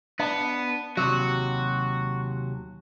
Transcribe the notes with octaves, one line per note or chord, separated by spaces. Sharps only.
B3 D4
D#2 C3 F#3 F#4